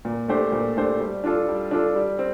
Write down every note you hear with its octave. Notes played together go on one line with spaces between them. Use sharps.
A#2
A3 D4 G4 C5
A#2
A3 D4 G4 C5
G3
D4 F4 A4
G3
D4 F4 A4
G3
C4